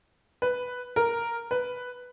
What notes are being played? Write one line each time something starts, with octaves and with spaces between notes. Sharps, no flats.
B4
A#4
B4